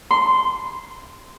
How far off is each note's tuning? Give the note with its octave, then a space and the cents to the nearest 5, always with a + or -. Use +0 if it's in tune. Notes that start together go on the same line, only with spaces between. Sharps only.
C6 -15